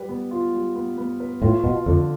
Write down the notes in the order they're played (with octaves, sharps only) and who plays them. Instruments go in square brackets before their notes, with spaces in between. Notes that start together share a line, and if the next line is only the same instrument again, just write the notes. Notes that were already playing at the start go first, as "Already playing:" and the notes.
Already playing: [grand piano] G3 B4
B3
F4
G3
B3
B3
B4
[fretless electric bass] A2 [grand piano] F4
[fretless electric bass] B2 [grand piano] F4
[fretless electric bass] F2 [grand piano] D3